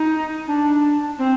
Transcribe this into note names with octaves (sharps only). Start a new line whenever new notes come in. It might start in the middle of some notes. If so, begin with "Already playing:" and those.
Already playing: D#4
D4
C4